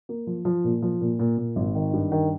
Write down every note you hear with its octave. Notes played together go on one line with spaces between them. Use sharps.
A#3
F3
F3
A#2
F3
A#2
A#2
A#2
G#1
D#3
G2
D#3